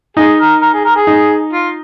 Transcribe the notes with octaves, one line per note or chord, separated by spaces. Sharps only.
D#4 G#4
A#4
A#4
G#4
A#4
G#4
D#4
F4